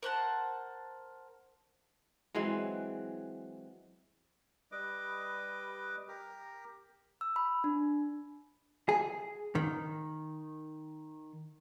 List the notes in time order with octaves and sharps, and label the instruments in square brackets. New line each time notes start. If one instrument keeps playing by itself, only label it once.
[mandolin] A#4 C5 F#5 A5
[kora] E3 F#3 G#3 C4
[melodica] G3 B4 D#5 D6
G4 A#4
[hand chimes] E6
B5
D4
[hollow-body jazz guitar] G#4
D#3